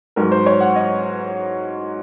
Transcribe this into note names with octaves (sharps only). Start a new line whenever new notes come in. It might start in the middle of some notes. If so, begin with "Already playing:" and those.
G#2 F#3 A#4
C5
C#5
F#5
D#5